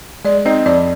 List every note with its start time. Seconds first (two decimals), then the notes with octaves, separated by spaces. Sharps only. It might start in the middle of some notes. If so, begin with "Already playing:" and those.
0.24 G#3 D5
0.45 C4 D#4 D#5
0.66 F2 D5